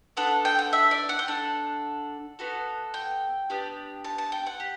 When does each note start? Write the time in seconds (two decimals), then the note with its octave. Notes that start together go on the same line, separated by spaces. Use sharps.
0.17 B3 D4 A4 F#5
0.45 G5
0.59 F#5
0.73 E5
0.91 D5
1.09 F#5
1.19 G5
1.28 D4 A4 F#5
2.39 B3 F#4 A4
2.94 G5
3.50 B3 D4 G4
4.04 A5
4.18 A5
4.32 G5
4.46 F#5
4.60 G4